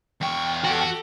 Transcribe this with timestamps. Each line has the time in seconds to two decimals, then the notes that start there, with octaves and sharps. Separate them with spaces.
0.21 E2 G5 C#6
0.64 F#4 G4 A4